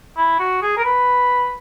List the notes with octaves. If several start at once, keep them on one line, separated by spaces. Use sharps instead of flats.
E4
F#4
G#4
A#4
B4